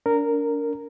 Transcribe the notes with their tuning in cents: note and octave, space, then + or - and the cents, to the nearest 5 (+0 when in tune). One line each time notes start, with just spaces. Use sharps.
D4 -35 A#4 -10